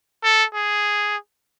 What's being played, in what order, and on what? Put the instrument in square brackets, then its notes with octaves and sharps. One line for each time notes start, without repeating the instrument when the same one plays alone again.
[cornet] A4
G#4